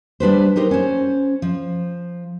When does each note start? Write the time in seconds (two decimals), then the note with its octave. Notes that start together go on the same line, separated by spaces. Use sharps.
0.20 G3 D4 B4 C5
0.56 D#4 G4 A#4 C5
0.71 C#4 C5
1.42 F3